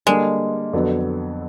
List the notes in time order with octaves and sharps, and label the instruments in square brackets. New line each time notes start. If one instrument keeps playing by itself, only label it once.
[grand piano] D3 G3 A#3 D4 [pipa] G#3
[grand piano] F2 D3 F#3 B3